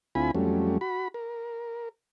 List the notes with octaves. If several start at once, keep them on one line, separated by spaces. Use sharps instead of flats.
D2 C4 E4 F4 G#5 B5
F2 F#3 G3 A3 C#4
F#4 B5
A#4